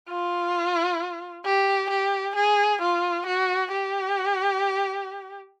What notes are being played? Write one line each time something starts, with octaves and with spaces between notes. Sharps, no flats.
F4
G4
G4
G#4
F4
F#4
G4